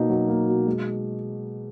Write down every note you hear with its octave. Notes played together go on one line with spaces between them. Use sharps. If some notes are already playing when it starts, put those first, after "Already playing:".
Already playing: B2 A#3 D#4
F#3
A#3
B2
G#3